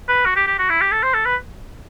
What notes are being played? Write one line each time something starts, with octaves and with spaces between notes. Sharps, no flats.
B4
F#4
G4
G4
F#4
E4
G4
A4
C5
A4
B4